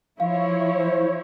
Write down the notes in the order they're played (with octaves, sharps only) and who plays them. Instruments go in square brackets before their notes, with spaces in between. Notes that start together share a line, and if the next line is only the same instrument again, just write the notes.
[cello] F3 [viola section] E4 C#5 [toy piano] F5
[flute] C5